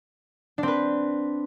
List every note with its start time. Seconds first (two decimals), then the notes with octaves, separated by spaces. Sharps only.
0.58 D4
0.63 C4
0.68 B4